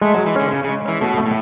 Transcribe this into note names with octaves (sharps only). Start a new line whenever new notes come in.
G#3 A3
F#3
G#3
E3
D3 C#4
C#3 C#4
C#3
G#3
E3 C#4
B2 A3
A3
A2